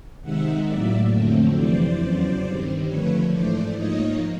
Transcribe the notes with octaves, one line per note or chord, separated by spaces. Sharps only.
C3 D#3 G#3 C4 D#4 E5 F#5
A2 F#3 A#3 D5 E5
F2 D3 F#3 A3 C4
F2 C3 E3 C5 D5
E2 C#3 F#3
G2 D#3 G3 C4
D3 F3 A3 B4 C#5
G#2 E3 A3 C5 D5
G#2 F3 A#3 D#4 C#5 D#5